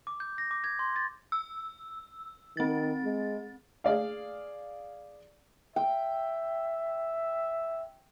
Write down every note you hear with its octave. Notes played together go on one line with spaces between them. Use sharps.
D6
G6
A#6
D6
G#6
C6
A6
E6
D#3 C4 A6
G#3
G#4 D5 F5
E5 G5